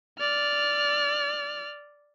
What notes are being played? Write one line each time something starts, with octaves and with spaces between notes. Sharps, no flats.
D5 F6